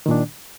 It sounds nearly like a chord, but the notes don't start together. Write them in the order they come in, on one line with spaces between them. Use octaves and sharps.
D#3 A#2 D4